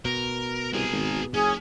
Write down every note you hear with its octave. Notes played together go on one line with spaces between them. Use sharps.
B2 A#4
C2 G#4 A#4
G#1
F#1 C#4 G#4